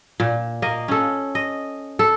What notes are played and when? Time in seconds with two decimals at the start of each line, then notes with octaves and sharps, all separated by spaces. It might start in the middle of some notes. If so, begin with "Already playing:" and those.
0.20 A#2
0.62 A#3 D#5
0.88 C#4 A4
1.35 D#5
1.99 A4